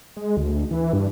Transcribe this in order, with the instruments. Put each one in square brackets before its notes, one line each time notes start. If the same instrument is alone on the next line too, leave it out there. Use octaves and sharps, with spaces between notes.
[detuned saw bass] G#3
D2
E3
G2